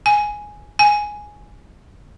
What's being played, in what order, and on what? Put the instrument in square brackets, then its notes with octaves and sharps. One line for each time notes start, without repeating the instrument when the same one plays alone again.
[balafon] G#5
G#5